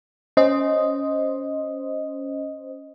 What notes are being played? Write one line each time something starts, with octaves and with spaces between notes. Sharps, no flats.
C#4 C5 D#5